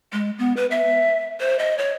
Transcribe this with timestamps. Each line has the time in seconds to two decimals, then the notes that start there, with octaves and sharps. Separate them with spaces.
0.13 G#3
0.39 B3
0.57 B4
0.71 E5
1.40 C5
1.59 D#5
1.78 C#5